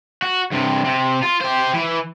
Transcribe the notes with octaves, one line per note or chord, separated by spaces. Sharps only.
F#4
G2 C3
C3
F4
G4 C5
E3